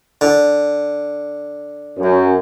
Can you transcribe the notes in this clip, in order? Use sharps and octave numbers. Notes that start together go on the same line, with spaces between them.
D3
F#2